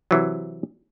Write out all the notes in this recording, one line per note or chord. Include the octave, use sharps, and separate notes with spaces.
C3 E3 F#3